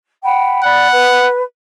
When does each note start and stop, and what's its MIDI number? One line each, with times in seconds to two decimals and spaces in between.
0.22 0.62 78
0.22 0.62 79
0.22 0.62 83
0.63 0.88 74
0.63 1.27 78
0.63 0.88 83
0.93 1.42 71